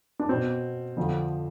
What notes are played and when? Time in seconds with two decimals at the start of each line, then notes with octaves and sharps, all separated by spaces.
0.20 D4
0.29 B2 C4
0.97 F2 D3 F3